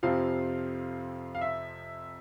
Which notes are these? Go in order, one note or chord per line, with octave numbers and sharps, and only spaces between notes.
F2 C3 F3 C4 F4 F5
F5
E5